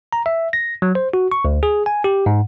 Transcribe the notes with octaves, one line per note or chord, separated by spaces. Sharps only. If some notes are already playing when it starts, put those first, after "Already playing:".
A#5
E5
A#6
F#3
C5
F#4
C#6
D2
G#4
G#5
G4
G#2